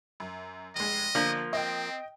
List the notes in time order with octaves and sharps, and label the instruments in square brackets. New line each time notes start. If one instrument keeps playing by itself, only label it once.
[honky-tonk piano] F#2
[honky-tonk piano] F1 G#3 [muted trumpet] D#5
[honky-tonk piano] D3 D4 [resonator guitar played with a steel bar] F3 A#3
[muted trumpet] C4 [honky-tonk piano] D#5 G5